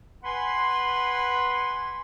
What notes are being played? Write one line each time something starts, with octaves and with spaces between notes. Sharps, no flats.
B4 F#5 G#5 B5 C6